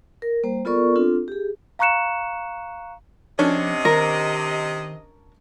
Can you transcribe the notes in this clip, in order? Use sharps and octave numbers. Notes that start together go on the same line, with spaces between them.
A#4
G3 A#3 C5
B3 F4 A4 A#4 D5 C#6
C4 D4 F4 A4
G4 G#4
F5 A#5 C#6 F#6 C#7 E7
C3 F3 C#4 D4 D#5
D#3 A#4